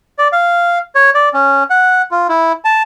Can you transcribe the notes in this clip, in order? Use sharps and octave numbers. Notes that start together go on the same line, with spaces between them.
D5
F5
C#5
D5
C#4
F#5
F4
E4
A5